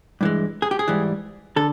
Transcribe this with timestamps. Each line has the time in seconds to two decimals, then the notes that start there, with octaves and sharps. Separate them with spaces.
0.21 G2 E3 G#3
0.62 G#4
0.71 G4
0.79 G#4
0.88 G#2 E3 G3
1.56 D3 A4